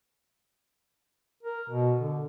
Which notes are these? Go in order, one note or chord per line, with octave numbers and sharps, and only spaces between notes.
A#4
B2
D3